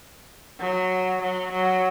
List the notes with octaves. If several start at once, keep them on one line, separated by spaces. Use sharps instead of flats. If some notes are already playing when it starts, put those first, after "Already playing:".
F#3
F#3
F#3